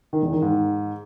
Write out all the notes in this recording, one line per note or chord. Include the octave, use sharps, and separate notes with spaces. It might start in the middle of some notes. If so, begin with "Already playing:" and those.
D#3
E2
D#3
G#2